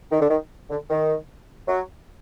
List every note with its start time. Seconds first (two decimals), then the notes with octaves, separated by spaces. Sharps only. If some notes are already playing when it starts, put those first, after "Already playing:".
0.11 D#3
0.20 D3
0.30 D#3
0.70 D3
0.90 D#3
1.68 F#3